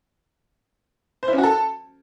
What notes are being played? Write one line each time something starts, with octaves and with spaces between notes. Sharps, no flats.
C5
E4
C#4
F#4
A4